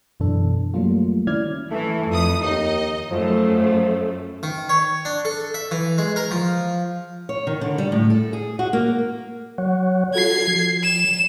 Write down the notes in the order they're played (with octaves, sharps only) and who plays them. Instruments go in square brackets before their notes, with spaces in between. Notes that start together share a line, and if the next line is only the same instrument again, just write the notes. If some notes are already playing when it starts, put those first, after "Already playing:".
[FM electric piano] F#2 B2 E3 D4 A4
F#3 G3 A3 A#3 F4
D#3 C#4 E4 D5 F6 G#6
[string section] E3 [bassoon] A3
[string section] F2 D#6
[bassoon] D#2 [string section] D#4 D#5
[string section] F#2 A3 [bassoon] F3
[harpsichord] D#3
C#5
D4
A4
E5
E3
G#3
A#4
F3
[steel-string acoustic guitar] C#5
D#3
D3
G3
A2
A4
G#4
F#4
A#3
[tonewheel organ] F#3 C#5 F#5
[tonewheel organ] F4 F#4 A4 [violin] G#6 C7
[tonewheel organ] F3
[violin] E7